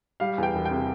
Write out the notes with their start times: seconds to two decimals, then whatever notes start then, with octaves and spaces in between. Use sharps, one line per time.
0.20 G3 F5
0.38 E2 G5
0.54 E1
0.65 G5
0.71 C3